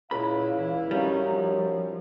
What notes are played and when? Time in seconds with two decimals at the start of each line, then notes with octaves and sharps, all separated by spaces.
0.11 C#2 A#2 E4 D5 E5 F5 B5
0.55 E3 E4
0.91 F#2 G3 C#4 D#4
1.32 F3